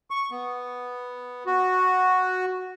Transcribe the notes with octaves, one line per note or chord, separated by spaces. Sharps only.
C#6
B3
F#4